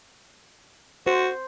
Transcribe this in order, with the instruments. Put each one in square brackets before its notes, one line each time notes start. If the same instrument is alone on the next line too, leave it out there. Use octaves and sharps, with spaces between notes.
[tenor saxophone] F#4 [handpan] C5